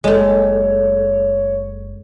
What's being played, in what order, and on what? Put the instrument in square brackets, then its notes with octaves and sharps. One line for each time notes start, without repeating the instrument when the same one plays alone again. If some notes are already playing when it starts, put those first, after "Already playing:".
[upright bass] F#1 [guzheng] G#3 A3 [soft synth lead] C#5